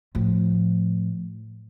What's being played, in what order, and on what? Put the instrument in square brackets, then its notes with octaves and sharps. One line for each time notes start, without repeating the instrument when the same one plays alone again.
[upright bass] A2 F3